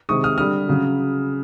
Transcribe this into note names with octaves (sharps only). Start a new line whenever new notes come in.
C3 D#3 G#3 C#6 D#6
D#6 F6
D3 G3 D#6 F6
C#3 F#3